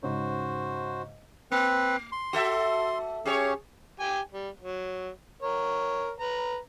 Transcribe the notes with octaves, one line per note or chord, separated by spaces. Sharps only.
G#2 C#3 F#4 C5
A#3 C4 B4
C6
F#4 A4 E5
C#4 G4 G#4 C#5
G4 G5 G#5
G3
F#3
A#4 C#5
B4 A#5